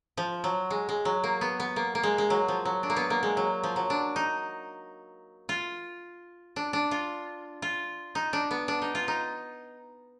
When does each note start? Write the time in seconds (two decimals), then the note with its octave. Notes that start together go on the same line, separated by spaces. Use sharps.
0.17 F3
0.44 F#3
0.70 G#3
0.89 G#3
1.05 F#3
1.24 A#3
1.41 B3
1.60 B3
1.76 A#3
1.95 A#3
2.03 G#3
2.18 G#3
2.30 F#3
2.48 F3
2.65 F#3
2.83 D4
2.90 A#3
2.96 B3
3.10 A#3
3.23 G#3
3.37 F#3
3.63 F3
3.76 F#3
3.90 D4
4.16 D#4
5.49 F4
6.56 D4
6.73 D4
6.91 F4
7.62 F4
8.15 D#4
8.33 D4
8.51 B3
8.68 D4
8.82 D#4
8.95 F4
9.08 D#4